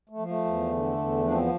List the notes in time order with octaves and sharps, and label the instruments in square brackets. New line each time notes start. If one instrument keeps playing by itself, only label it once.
[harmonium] A3
F3
A3
E2
D3
E2
F3 D4
C4
B3